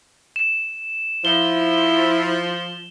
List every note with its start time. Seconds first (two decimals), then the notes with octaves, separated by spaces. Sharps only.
0.36 E7
1.25 F3 E4 G7